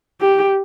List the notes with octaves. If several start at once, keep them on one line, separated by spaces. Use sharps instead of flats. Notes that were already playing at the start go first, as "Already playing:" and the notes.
G4